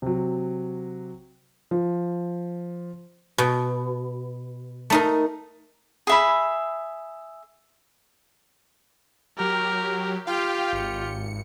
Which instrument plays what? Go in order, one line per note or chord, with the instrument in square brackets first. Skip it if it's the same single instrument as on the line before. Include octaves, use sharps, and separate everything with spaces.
[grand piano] C3 F#3
[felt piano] F3
[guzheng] B2
A3 D#4 A#4
[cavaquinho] G#4 E5 B5
[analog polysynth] F#3 G4 [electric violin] A#4
[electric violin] F4 G4 [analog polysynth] F5 G5
[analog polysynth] G#1 C#7